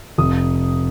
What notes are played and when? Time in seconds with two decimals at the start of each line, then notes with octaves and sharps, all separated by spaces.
0.18 F1 D#6